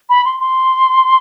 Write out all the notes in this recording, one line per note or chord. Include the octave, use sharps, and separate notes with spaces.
B5
C6
C6